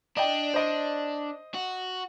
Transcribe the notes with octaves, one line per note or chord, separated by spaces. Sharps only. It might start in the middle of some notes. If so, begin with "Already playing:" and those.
D4 D#5 G5
C5 D#5
F#4